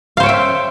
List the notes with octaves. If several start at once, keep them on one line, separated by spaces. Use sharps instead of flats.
C5 C#5 E5 F5 G5